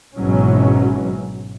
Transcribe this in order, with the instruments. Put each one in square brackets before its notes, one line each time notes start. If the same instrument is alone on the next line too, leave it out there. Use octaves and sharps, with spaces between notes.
[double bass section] G#1 G#2 B2 E3 F#3 C#4